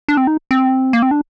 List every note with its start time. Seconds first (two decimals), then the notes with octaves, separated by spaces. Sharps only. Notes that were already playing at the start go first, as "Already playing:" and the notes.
0.08 D4
0.17 C4
0.27 D#4
0.51 C4
0.93 A#3
1.02 C4
1.11 D4